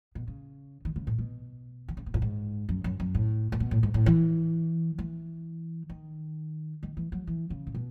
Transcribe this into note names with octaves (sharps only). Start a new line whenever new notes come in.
B2
C#3
D#3
C#3
A2
B2
D#3
C#3
B2
A2
G#2
F#2
F#2
F#2
A2
A2
B2
A2
G#2
A2
E3
E3
D#3
D#3
E3
F#3
E3
C#3
A2
B2